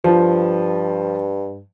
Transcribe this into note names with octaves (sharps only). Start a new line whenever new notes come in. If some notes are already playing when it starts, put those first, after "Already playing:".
G2 F3